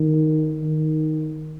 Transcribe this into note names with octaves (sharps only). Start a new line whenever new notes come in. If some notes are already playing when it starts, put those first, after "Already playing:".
Already playing: D#3
D#3